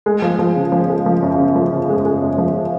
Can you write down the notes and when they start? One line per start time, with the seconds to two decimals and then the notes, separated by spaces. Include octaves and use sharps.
0.06 G#3
0.22 F3
0.39 F3
0.56 C#3
0.72 F3
0.89 G#3
1.06 F3
1.22 F#2
1.39 C#3
1.56 F3
1.72 C#3
1.89 G#3
2.05 G#3
2.22 F#2
2.38 F3